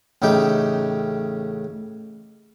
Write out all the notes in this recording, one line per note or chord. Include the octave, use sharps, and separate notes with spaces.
A1 C#3 A3 D#4 G4 G5